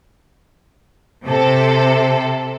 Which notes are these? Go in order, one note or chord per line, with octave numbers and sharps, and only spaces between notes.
C3 A4